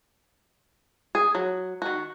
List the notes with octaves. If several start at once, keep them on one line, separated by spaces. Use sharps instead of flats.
G#4
F#3
D#3 F#4